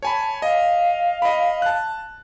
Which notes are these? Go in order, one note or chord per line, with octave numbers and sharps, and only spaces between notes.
C#5 G#5 A5 B5
D#5 F5
D#5 B5
A5 F#6